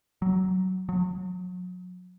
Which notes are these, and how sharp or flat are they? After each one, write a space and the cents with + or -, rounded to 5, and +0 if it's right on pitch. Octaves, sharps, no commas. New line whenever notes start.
F#3 +15
F#3 -35